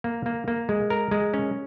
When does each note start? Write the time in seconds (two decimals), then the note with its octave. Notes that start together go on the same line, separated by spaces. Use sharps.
0.04 A#3
0.26 A#3
0.48 A#3
0.69 G#3
0.90 A#4
1.11 G#3
1.34 C#4